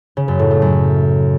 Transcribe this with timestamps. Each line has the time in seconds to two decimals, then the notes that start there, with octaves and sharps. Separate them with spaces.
0.17 C#3
0.28 F#2
0.39 A2
0.51 A3
0.62 F#2